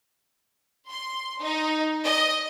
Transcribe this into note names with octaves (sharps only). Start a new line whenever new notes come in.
C6
D#4
D#5